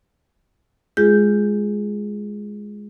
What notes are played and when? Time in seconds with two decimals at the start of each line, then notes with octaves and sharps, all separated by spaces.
0.97 G#3 F4 G#4 G6